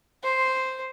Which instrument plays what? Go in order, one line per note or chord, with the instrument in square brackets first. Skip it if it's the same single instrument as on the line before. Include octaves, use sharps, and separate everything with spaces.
[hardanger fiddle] C5